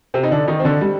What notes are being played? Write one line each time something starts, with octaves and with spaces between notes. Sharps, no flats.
C3 C4
D#4
D3 D4
D#3 D#4
C4
D3 D4
G3